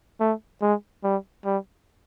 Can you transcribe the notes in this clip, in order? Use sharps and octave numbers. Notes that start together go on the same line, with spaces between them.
A3
G#3
G3
G3